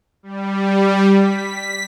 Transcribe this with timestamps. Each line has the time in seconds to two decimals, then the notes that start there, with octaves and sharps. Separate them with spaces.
0.23 G3
1.15 B6